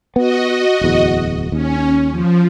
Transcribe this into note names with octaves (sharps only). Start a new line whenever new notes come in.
B3 F#4 D#5
D1 E2
D#2 C#4
F3